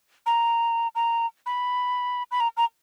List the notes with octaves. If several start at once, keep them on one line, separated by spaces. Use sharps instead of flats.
A#5
A#5
B5
B5
A#5
A#5